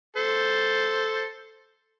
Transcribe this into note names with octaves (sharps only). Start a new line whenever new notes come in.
A4 C5